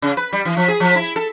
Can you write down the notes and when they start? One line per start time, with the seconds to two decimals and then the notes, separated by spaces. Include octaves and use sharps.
0.02 C#3
0.17 B4
0.33 G3
0.45 E3
0.57 F3
0.68 G#4
0.80 F3
0.95 E4
1.16 A4